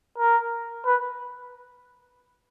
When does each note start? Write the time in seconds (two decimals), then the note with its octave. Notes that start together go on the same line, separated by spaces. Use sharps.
0.18 A#4
0.86 B4